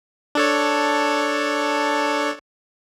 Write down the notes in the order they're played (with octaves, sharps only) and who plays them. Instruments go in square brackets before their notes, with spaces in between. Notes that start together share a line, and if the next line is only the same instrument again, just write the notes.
[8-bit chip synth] D4 A4 C#5